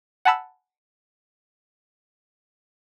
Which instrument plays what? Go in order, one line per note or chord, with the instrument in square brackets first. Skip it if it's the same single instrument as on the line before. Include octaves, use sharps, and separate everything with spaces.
[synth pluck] F#5 G#5 A5 B5 E6